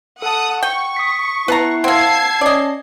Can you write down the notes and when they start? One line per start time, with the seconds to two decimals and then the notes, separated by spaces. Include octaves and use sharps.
0.22 A4 F#5 A5 D#6
0.63 F#5 G5 C#6
0.96 D#6 B6
1.48 B3 E4 B4 A5 A#5 F#6 C7
1.84 A#3 C4 F#5 A5 E6 G#6 C7
2.41 C#4 D5 D#5